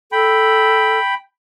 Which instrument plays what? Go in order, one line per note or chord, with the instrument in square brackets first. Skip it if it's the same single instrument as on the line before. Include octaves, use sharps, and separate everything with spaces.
[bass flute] A4 [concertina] G5 B5